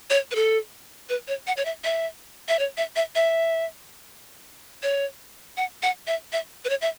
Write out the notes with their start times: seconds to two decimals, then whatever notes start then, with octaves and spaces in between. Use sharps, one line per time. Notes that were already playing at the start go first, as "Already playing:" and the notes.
0.10 C#5
0.31 B4
0.35 A4
1.09 B4
1.28 C#5
1.47 F#5
1.57 C#5
1.65 E5
1.84 E5
2.48 E5
2.59 C#5
2.77 E5
2.96 E5
3.15 E5
4.83 C#5
5.57 F#5
5.82 F#5
6.07 E5
6.33 E5
6.65 B4
6.69 C#5
6.81 E5